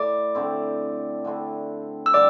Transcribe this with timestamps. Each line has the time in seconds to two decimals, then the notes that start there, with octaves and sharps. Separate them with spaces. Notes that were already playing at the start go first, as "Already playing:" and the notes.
Already playing: A2 A3 E4 D5 D6
0.35 D3 A3 C4 E4
1.25 D3 A3 C4 E4
2.06 E6
2.14 D3 G3 D5 D6